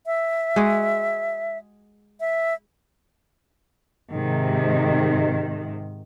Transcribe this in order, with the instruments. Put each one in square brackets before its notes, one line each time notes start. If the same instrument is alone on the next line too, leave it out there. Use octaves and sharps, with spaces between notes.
[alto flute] E5
[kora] G#3 F#4 G#4
[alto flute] E5
[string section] G#2 C3 D#3